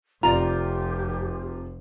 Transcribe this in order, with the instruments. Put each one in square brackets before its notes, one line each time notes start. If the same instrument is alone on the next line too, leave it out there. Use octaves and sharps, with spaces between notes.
[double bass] F1 [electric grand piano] C3 F4 [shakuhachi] G4 [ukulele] D5 A#5